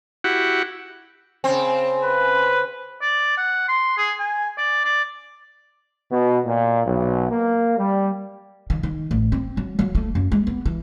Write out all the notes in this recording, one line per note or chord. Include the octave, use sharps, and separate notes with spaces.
E4 F#4 G4 F#5
C#3 C4
B4
D5
F#5
C6
G#4
G#5
D5
D5
B2
A#2
B1
A#3
G3
D#3
D#3
A1
C4
F#3
F#3
A3
F#2
G#3
B3
E3